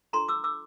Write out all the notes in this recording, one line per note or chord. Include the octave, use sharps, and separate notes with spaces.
D4 F4 A4 A#5 C6
D6 E6
D6 E6